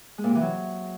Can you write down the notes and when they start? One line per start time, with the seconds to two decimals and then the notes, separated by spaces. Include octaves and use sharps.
0.18 G#3
0.24 A#2
0.29 C3
0.35 E3
0.41 F#3